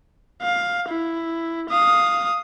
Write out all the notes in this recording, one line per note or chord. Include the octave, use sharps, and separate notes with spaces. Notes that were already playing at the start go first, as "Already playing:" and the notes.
F5
E4
F5 D#6